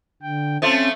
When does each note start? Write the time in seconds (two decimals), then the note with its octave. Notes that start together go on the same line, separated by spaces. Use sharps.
0.22 D3 G5
0.62 F3 A3 C4 C#4 F4